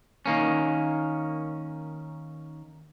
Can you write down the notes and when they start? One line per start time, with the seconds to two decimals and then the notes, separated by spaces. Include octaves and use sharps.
0.26 D#3 A#3 C#4